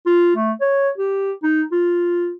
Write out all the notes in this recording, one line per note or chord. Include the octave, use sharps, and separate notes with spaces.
F4
A3
C#5
G4
D#4
F4